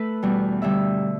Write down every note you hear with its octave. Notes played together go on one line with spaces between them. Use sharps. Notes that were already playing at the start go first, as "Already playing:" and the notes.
Already playing: A3 A4 B4 E5
E2 B2 G3
G2 D3 G3 E5